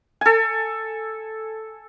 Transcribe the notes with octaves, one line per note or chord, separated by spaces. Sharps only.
A4 G#5